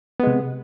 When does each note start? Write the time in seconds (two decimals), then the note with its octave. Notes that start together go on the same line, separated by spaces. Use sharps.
0.20 B3
0.23 G#3
0.27 C3